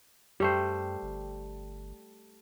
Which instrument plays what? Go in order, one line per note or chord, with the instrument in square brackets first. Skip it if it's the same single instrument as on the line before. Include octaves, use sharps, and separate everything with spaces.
[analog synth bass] F#2 [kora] G3 A3 C5 [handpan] G4
[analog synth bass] G1